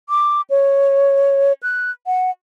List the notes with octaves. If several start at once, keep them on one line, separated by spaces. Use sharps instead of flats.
D6
C#5
F#6
F#5